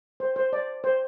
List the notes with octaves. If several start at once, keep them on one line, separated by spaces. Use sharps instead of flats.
C5
C5
D5
C5